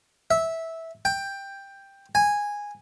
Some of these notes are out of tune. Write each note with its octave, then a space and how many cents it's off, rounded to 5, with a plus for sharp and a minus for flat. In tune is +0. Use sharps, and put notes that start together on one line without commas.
E5 -10
G5 +10
G#5 -10